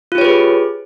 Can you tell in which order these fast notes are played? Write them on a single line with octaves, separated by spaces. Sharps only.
F4 G4 C#5 B4 G#4